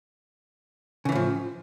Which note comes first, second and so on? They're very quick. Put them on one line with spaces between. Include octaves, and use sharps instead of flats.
C#3 E3 A2 F3